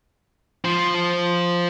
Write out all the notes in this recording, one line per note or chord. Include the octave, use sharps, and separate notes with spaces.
F3 C5